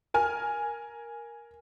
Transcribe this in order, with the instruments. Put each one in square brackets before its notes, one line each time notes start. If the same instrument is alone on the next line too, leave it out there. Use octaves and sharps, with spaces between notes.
[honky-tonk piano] A#4 G#5 F6